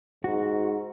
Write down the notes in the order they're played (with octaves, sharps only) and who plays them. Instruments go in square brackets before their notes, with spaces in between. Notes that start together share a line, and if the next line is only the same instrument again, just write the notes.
[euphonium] G#2 [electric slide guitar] F#4